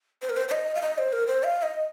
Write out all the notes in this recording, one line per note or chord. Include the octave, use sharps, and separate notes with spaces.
C5
A#4
C5
C5
D#5
F5
D#5
C5
A#4
C5
F5
D#5